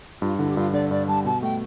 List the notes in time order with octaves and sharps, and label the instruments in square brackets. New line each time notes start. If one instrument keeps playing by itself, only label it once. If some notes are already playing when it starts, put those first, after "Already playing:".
[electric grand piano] G2 [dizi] F4
[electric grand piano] D3 [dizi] E4
[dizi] G4
[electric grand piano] G2 [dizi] F4
[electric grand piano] D3 [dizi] D5
[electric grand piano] G2 [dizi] D5
[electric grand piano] G3 [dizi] A5
[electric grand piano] B2 [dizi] A5
[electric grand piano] A3 [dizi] G5